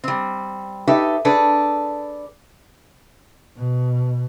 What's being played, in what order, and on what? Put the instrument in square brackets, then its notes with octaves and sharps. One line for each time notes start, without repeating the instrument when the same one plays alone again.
[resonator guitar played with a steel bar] G3 C4
D#4 G4 A4 B4 E5
D4 G#4 A4 B4
[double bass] B2